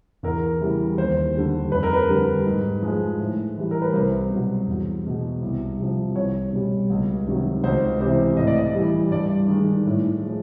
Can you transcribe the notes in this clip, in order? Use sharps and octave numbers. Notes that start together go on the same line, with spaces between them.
E2 A#4
C#3 E3 G3
D#2 C5
D3 G3
F2 B4
A#4
B4
D3 G3
G#2
F3 G#3
A2
E3 G3
A#4
B4
C2 C5
B2 F#3
E2
B2 G#3
C2
C3 F3
C2 C#5
B2 G3
C#2
C3 D#3 F#3
C#2 C5
C3 E3 C5
A2 D#5
D5
D#5
E3 G3
G2 D5
D#3 G#3
A2
F3 G#3